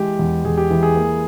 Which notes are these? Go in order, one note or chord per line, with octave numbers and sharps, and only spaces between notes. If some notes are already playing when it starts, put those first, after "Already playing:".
Already playing: E3 G#3 G4
E2
E2 G#4
G4
E3
G#4
A#3